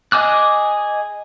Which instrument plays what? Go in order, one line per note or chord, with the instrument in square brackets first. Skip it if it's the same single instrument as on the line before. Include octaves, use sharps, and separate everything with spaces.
[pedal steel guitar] G#4 D#5 G#5 D6 F#6